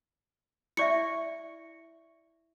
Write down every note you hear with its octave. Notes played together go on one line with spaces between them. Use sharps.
E4 D5 E5 C#6 C#7